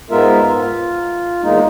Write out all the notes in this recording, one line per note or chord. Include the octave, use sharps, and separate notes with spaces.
G#2 G#3 B3 F4 A#4 E5
F4
E2 G#3 A#3 D#4